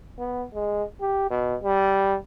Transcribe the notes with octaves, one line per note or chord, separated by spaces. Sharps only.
B3
G#3
G4
B2
G3